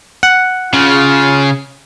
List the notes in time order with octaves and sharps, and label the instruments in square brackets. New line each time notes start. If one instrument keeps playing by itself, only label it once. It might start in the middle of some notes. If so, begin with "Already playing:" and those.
[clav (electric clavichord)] F#5
[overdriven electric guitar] C#3 [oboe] F4